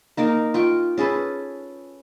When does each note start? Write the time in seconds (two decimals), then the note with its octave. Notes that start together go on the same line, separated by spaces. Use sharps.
0.17 A#3 D#4 A#4 F5
0.54 F4 G5 C#6
0.98 C#4 G#4 A4 B4